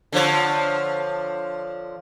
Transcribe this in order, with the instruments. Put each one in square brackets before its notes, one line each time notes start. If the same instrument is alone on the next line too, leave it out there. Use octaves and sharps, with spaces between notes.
[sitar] D3 F3 C#5